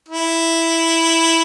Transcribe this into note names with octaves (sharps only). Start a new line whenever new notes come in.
E4